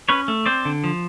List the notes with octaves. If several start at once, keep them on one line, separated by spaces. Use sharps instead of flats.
C#4 B4 C#5
A3
C4 C5 D5
D3
F3